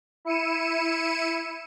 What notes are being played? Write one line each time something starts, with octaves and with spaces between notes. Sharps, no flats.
E4 C#7 D#7 E7